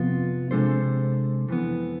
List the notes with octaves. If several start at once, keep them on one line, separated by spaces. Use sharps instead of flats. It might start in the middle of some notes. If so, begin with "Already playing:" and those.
Already playing: F2 C3 F3 B3 F4
C3 G#3 D4 A4 C5
F2 E3 B3